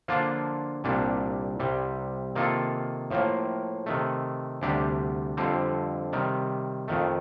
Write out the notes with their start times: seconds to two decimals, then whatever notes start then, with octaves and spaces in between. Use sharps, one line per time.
0.08 D3 F3 A#3 D4 F4
0.84 C2 A#2 G3 D4
1.60 C2 C3 G3
2.35 C3 D#3 A#3 F4 A4
3.11 A2 F3 A#3
3.86 C3 D#3 A3
4.61 D2 C3 G3 D4 G4
5.37 F2 D3 G3 C4
6.13 C3 D#3 G3
6.88 F2 D#3 A3